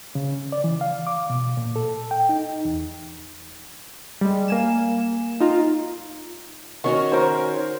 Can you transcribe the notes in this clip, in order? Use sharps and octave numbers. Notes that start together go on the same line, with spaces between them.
C#3
D5
E3
F5
D6
B2
A#2
A4
G5
D#4
E2
G3 G#3
A#3 G#5 E7
D#4 F4 A#5
D#3 C#4 F#4 C#6
A#4 C5